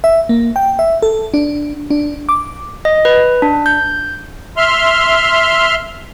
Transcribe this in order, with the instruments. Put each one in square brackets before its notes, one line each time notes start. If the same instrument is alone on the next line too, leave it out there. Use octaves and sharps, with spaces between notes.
[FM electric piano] E5
A#3
G5
E5
A4
D4
D4
D6
[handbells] D#5
B4
D4
G6
[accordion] E5 C6 F6